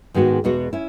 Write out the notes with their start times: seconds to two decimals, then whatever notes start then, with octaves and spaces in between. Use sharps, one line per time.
0.14 G#2 D#3 G#3 B3 F#4
0.44 E2 B2 G#3 B3 F#4
0.73 C#4 E4